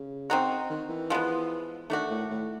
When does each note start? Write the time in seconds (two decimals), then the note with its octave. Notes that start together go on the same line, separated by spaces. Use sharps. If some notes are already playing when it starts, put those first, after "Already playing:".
Already playing: C#3
0.30 C4 D#4 F#4
0.70 D#3
0.90 E3
1.10 F3 G#3 B3
1.90 D#3 A3 D4 F#4
2.11 A2
2.31 A2